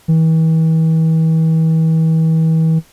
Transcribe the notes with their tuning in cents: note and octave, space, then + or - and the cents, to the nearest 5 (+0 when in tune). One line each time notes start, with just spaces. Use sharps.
E3 -40